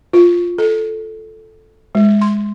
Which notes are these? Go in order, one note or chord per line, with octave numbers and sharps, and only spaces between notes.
F4
A4
G#3
C6